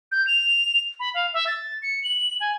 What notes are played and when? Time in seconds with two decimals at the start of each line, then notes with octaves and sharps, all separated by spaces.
0.12 G6
0.27 F7
1.00 B5
1.14 F5
1.33 E5
1.47 A6
1.83 C#7
2.04 F#7
2.40 G#5